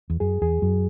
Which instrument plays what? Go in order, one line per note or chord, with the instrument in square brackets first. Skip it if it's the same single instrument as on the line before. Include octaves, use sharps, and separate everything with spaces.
[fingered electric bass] E2
[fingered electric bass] F#2 [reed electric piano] G#4
[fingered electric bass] E2 [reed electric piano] G#4
[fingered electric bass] F#2 [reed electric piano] F#3